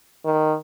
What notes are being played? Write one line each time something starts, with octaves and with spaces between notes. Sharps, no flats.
D#3